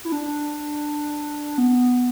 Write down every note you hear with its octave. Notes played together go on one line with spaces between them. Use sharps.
E4
D4
B3